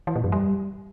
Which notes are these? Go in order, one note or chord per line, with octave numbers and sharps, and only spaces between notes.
E3
A#2
F#2
G3